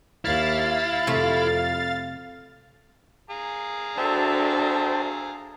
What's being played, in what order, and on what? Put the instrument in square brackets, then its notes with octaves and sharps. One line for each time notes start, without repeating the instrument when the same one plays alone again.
[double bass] D#2 [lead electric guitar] E4 [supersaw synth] F5 A6
[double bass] F2 [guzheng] C3 A3
[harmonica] G#4 F5 A#5
[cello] D4 F#4 [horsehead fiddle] A4 E5 [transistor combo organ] C5 G5 A5